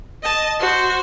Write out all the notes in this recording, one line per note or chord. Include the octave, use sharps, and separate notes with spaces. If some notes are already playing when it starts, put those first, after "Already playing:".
D#5 A5
F#4 C5